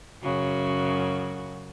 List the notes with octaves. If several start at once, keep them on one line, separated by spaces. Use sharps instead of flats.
F#2 C#3 F#4